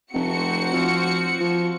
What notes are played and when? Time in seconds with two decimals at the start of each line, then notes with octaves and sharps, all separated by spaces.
0.14 F1 C4 F#4 C#7
0.73 F3
1.41 F3